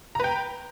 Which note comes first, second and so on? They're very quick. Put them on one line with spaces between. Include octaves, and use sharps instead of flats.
A#5 B4 G5